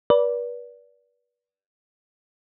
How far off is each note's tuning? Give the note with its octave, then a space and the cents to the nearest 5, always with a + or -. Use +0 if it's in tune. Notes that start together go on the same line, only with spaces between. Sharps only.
B4 -35 D5 -20